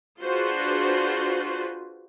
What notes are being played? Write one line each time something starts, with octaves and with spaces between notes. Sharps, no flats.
D4 F4 F#4 G#4 B4 C5